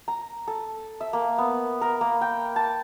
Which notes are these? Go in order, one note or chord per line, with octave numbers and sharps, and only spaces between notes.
A#5
A4
E5
A#3
B3
A#4
A#3
G5
A5